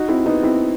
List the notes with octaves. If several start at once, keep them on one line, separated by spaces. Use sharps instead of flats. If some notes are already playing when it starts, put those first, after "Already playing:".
Already playing: D#4 F#4
C4 E4
B3 D#4
C4 E4